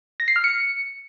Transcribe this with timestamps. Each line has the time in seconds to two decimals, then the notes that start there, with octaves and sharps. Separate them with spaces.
0.20 A#6
0.28 C7
0.36 F6
0.44 C#7